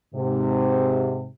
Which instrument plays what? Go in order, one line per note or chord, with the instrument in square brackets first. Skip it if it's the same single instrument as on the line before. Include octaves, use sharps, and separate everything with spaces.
[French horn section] G#2 C3